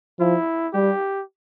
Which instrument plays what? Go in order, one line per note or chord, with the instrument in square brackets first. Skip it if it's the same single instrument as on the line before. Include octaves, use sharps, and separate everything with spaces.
[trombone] F3 [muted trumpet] E4
[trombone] G3 [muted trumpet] G4